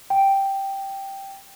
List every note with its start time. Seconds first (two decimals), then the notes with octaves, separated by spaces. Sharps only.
0.10 G5